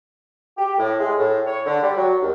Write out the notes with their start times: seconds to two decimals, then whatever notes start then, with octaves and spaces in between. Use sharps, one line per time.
0.57 G4
0.78 A2
0.99 G#3
1.18 A2
1.47 C#5
1.66 D3
1.82 G3
1.97 F#3
2.21 D#2